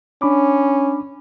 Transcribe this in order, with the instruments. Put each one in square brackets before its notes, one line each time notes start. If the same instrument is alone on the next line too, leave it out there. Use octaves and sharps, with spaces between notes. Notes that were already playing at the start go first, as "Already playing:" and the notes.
[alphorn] C#4 [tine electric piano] D4 B5 D6